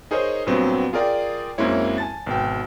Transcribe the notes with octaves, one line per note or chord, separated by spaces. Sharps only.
D#4 G#4 A#4 C5 C#5 D#5
G2 A#2 F#3 B3 C4
F4 G#4 A#4 D5 G5
F#2 G#3 A#3 C4 E4 C#5
G#5 A5 A6
G#1 B2 G5